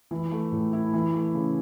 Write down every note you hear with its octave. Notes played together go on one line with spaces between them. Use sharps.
E3
A3
A2
E4
E3
A3
C#3